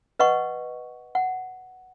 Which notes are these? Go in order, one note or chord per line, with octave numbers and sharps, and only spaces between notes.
B4 D#5 F#5 C#6
F#5